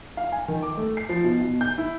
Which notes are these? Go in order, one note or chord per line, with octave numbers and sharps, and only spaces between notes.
F5
G#5
D#3
D6
A3
C7
F3
B2
B2
G6
E4